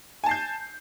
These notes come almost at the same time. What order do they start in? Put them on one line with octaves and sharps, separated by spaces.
G#5 A5 C7 G6